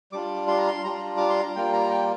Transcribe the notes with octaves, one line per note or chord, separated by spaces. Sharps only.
G3 D4 F4 D6
C6
A#5
C6
G3 D4 F4 A#5
D6
C6
A#5
G3 A#3 F4 G5
A#5
G5